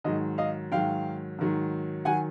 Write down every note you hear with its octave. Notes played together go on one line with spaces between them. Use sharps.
G#2 D#3 F#3 D#5
D#5 F5
G#2 D#3 F#3 F5 G5
G#2 D#3 F#3
D#3 F#3 F#5 G#5